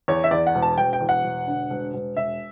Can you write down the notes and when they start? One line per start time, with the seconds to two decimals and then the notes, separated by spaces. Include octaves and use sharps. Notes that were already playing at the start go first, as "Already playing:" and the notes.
0.08 E2 C#5
0.24 E5
0.31 E2 D5
0.47 F#5
0.55 E1
0.62 A5
0.78 E1 G5
0.93 G5
1.01 E2
1.09 F#5
1.24 E1
1.47 D3
1.70 E1
1.94 E1
2.17 E1 E5